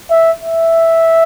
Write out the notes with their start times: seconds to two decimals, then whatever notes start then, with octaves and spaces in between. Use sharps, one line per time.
0.11 E5
0.41 E5